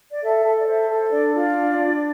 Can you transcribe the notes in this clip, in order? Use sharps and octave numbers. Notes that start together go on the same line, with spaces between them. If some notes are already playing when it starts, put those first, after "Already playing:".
D5
A4 E5
A4
D5
C5 E5
A4
D4 D5
F4 D5
D4
D4